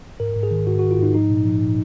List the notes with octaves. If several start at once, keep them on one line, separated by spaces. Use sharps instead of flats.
G#2 A#4
G#2
G#4
D#3
G#2 F#4
F#4
D#3
F4
G#2 D#4
F3 D#4
A#2
F3
A#2